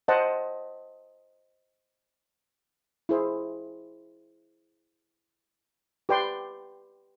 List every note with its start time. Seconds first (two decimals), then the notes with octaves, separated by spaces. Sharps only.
0.08 C5 D#5 F#5 A5
3.09 E4 G#4 C5
6.09 G4 B4 D5 G5 C6